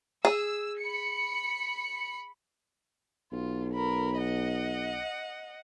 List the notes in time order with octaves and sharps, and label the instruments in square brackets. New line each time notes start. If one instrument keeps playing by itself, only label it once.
[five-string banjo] G#4 [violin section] E6
[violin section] B5 C#7
[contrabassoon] B1 [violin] F4
[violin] A#4 B5
D#5 F#5